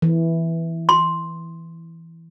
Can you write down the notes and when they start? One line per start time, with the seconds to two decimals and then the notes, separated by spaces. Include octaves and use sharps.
0.02 E3
0.89 C6